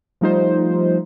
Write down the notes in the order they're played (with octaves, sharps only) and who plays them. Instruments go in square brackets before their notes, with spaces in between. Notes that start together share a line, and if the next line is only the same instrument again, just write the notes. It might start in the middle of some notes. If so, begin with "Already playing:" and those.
[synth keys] F3 G3 A3 D#4 F4 C5